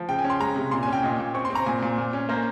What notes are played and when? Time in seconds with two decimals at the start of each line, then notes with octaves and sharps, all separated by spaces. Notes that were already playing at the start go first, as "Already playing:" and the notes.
Already playing: F3
0.09 C#3 G5
0.19 G#5
0.25 C#4
0.30 C6
0.40 G#3 A#5
0.56 C3
0.71 A#2 C6
0.83 C#4 G#5
0.93 G5
1.03 A#2 D#5
1.19 A#2
1.34 C4 C#6
1.45 C6
1.50 C4
1.55 A#5
1.66 A#2 G#5
1.82 A#2
1.98 A#2
2.13 C#4
2.29 A#3 C5